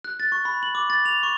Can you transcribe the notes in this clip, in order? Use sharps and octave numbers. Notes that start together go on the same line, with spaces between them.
F#6
A6
C#6
B5
F#7
D6
A6
F7
C#6